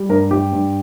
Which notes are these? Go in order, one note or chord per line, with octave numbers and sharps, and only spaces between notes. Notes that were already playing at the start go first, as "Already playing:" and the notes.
Already playing: G3
G2 A#4
G2 G4
G2